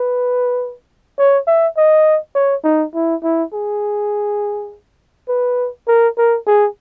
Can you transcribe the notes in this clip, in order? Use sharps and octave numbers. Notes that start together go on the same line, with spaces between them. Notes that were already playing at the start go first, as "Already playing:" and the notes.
Already playing: B4
C#5
E5
D#5
C#5
D#4
E4
E4
G#4
B4
A#4
A#4
G#4